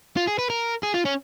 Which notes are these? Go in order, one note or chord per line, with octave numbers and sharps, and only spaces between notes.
F4
G#4
B4
A#4
G#4
F4
C#4